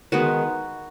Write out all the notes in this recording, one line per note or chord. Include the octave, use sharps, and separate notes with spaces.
D#3 G#3 B3 F#4